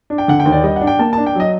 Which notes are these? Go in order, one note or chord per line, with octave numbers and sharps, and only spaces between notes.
D4
G5
D3 F#5
G5
D#2
D5
G3 D#5
F#5
D4
G5
A#3 A5
A5
D4
G5
F#3 D#5